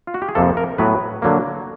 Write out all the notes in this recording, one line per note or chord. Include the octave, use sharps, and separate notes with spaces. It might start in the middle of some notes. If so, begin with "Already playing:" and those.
F4
F#4
G4
G#4
F2 C3 F3 A#3 A4
A#4
A2 F#3 B3 B4
D3 F#3 A#3